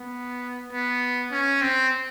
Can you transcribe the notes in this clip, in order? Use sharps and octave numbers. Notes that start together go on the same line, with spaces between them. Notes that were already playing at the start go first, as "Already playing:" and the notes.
Already playing: B3
B3
C#4
C4